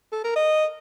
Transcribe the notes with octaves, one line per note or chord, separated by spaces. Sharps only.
A4
A#4
D#5